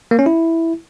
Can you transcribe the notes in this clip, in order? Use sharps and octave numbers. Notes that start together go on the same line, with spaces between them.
A#3
C#4
E4